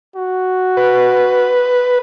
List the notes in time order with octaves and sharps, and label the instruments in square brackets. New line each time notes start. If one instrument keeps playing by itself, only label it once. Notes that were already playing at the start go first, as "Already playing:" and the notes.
[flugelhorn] F#4
[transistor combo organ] B4